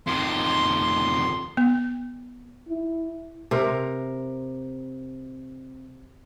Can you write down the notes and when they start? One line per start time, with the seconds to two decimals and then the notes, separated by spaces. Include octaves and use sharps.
0.07 F2 D#3 C6
1.57 B3
2.69 E4
3.51 C3 A#4